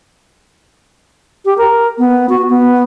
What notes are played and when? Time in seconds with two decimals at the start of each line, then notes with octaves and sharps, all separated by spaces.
1.45 G4
1.58 A#4
1.99 B3
2.29 F#4
2.50 B3